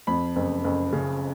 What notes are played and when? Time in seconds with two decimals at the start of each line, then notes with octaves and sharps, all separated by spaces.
0.07 F2 B5
0.36 F#1
0.64 F#1
0.93 C#3